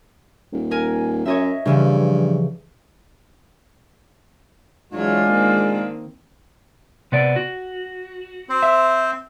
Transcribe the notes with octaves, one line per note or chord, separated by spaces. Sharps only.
D#1
A#4 G#5
F#2 C#5 D#5 E5
G2 C#3 E3 F3
E3 F#3 G#3 D4 F4 C#5
D#3 A#3 C4
C3 B3 D5
F#4
C4 C5
E5